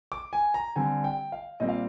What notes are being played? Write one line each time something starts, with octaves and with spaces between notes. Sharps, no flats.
D6
G#5
A#5
D3 G3 C4 G#5
G5
F5
A#2 G3 C4 D#5
F5